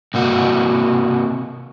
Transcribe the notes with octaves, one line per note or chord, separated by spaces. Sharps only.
C3 A#3 F#4